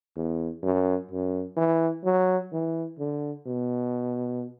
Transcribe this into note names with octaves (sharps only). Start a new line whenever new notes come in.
E2
F#2
F#2
E3
F#3
E3
D3
B2